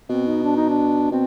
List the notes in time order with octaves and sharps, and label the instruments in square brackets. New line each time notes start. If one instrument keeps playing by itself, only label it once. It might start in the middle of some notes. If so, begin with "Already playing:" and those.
[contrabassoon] B2 [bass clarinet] C4
[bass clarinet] D#4
D4
D#4
D4
[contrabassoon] B2 [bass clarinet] C4